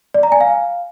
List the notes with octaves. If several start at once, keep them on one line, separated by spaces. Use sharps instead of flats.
D5
A#5
G#5
F5